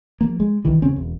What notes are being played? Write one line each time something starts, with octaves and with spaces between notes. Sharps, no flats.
F3 A#3
G#3
C2 D#3 E3
E1 C#3 C4 C#4
E1